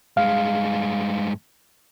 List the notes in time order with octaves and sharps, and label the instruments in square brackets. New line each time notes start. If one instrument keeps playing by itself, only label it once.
[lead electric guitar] G2 G#3 [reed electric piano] F5